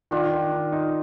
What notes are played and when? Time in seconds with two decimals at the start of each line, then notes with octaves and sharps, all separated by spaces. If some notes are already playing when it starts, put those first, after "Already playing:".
0.11 D#3 D4 F4
0.32 D#3
0.52 D#3
0.72 D#4